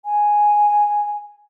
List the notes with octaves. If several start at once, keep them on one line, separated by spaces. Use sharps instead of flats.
G#5